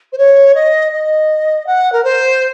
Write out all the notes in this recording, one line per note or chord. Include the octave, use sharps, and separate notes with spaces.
C5
C#5
D#5
D#5
F#5
A#4
C5